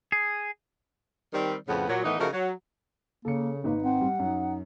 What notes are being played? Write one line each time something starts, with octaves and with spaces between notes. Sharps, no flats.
G#4
D#3 G3 C4
F2 A2 C#3 B3
A#2 F#3
A2 D#3 E3 B3 D#4
C#3 F3 A3 D#4 F#4 A#4
F#3
C#3 A#3 A4 C#7
G#1 A#3 D#4 B4
C4 F#5
G3
F#2 D#4